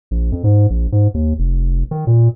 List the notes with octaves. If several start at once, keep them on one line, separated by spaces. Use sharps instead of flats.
A#1
F2
G#2
A#1
G#2
D#2
F1
D#3
A#2